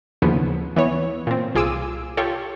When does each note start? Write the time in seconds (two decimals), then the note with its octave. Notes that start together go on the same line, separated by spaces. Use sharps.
0.22 D#2 A#2 C#3 E3 F3 B3
0.76 E3 B3 C#5
1.27 A#2 C4
1.55 C2 F4 G#4 D6 E6 D#7
2.17 F4 G4 A4 C#5